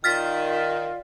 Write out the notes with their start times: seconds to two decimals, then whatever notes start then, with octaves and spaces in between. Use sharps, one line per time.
0.04 D#3 F4 D5 F5 F6 A6 B6